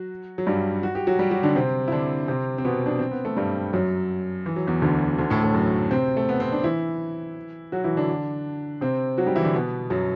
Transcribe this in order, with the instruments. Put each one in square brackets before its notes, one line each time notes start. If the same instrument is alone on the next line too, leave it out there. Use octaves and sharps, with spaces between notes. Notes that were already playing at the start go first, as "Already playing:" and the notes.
Already playing: [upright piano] F#3 F#4
F#3
G2 G3
F#4
G4
F#3 F#4
G3 G4
F#3 F#4
D3 D4
C3 C4
E4
D3 D4
C3 C4
C4
B2 B3
D4
C4
B3
A3
G2 G3
F#2 F#3
E3
F#3
E2 E3
D2 D3
D2 D3
A2 A3
A2 A3
F#2 F#3
C3 C4
A3
B3
C4
D4
E3 E4
F#3 F#4
E3 E4
D3 D4
C3 C4
F#3 F#4
G3 G4
E3 E4
D3 D4
B2 B3
F#2 F#3